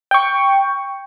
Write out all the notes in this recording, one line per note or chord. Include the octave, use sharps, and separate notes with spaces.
G5 C#6